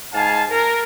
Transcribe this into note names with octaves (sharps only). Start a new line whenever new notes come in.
G#2 F5 G#5 A5
A#4